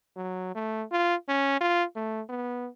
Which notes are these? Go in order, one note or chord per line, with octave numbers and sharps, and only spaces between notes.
F#3
A3
F4
C#4
F4
A3
B3